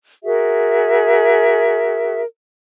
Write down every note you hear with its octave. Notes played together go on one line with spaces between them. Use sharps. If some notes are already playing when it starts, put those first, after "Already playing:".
F#4 G#4 A#4 E5